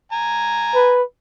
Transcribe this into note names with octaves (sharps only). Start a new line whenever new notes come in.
G#5 A#5
B4